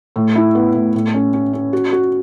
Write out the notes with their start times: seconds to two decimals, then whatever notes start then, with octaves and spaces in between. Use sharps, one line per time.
0.16 A2
0.36 E4
0.55 B3
0.74 A2
0.94 A2
1.14 C#4
1.34 C#4
1.53 C#4
1.73 F#4
1.92 F#4